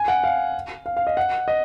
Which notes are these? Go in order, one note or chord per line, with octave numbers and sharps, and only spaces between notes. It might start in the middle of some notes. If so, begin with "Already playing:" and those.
Already playing: G#5
F#5
F5
F5
F5
D#5
F#5
D#5